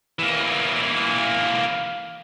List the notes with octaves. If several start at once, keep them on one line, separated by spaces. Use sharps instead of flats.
E3 A#3